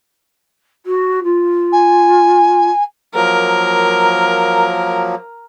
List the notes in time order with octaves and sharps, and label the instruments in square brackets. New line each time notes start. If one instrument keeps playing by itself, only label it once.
[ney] F#4
F4
[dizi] G#5
[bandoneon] F3 F#3 A#3 [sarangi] A#4